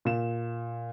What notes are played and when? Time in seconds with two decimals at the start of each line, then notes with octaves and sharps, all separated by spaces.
0.05 A#2 E7